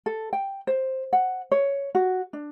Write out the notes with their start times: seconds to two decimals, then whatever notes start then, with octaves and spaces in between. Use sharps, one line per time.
0.06 A4
0.33 G5
0.67 C5
1.13 F#5
1.52 C#5
1.95 F#4
2.33 D4